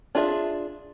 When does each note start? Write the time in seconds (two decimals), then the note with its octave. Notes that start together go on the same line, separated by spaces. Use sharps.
0.15 D4 F4 G#4 E5